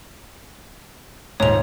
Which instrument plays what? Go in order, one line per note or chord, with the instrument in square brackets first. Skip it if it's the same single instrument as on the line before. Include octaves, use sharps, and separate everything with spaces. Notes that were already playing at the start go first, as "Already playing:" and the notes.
[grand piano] D#1 G#2 [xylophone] C#5 F7